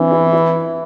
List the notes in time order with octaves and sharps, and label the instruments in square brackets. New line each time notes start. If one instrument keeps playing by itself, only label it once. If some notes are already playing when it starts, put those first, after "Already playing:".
Already playing: [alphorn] E3 [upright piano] C4 D4 E4
[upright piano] E4
E4